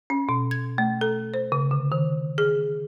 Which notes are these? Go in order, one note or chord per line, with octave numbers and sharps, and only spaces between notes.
C#4
B2
G#6
A3
A4
C5
C#3
D3
D#3
G#4